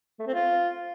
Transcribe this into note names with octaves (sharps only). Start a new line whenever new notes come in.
A3
C4
F4